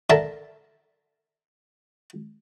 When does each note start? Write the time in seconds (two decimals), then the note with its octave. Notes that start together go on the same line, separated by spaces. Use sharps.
0.10 D3 A#4 E5 A5